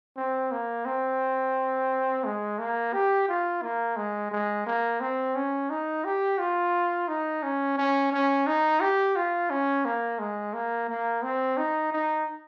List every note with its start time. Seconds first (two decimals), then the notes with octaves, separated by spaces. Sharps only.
0.17 C4
0.51 A#3
0.85 C4
2.24 G#3
2.59 A#3
2.93 G4
3.28 F4
3.62 A#3
3.96 G#3
4.32 G#3
4.66 A#3
5.00 C4
5.35 C#4
5.70 D#4
6.05 G4
6.38 F4
7.08 D#4
7.43 C#4
7.78 C#4
8.12 C#4
8.47 D#4
8.80 G4
9.16 F4
9.50 C#4
9.85 A#3
10.19 G#3
10.54 A#3
10.89 A#3
11.23 C4
11.57 D#4
11.92 D#4